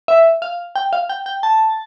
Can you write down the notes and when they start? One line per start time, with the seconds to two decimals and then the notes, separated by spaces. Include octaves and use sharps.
0.08 E5
0.42 F5
0.76 G5
0.93 F5
1.09 G5
1.26 G5
1.43 A5